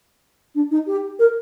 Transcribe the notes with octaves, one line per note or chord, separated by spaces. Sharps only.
D4
D#4
G4
A#4